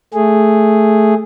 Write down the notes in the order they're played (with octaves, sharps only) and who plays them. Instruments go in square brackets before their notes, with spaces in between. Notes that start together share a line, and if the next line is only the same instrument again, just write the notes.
[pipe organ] A3 G#4